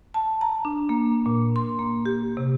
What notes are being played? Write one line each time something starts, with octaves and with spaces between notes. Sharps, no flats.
A5
A#5
D4
A#3
A#2
C6
A#3
G4
C3